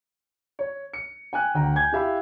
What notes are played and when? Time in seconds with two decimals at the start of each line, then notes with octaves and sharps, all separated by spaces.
0.59 C#5
0.94 C#7
1.33 G5 G#5 F#6
1.54 D2 G5 A#5
1.76 G#5 G6 G#6
1.92 E4 G4 E5 F5 B5